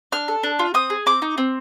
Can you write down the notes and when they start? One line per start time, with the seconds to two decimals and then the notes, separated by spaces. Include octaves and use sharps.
0.12 D4 F6
0.28 A4
0.43 D4
0.59 F4
0.74 C4 D#6
0.90 G#4
1.06 C4 D6
1.22 D#4
1.38 C4